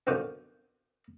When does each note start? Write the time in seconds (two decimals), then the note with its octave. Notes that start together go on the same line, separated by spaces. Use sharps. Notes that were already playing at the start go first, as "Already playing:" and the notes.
0.07 F#2 B2 D3 D#3 F3